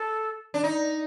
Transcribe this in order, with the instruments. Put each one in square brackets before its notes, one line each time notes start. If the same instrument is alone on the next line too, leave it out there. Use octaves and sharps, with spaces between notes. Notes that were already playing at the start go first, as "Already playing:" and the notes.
Already playing: [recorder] A4
[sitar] D4
D#4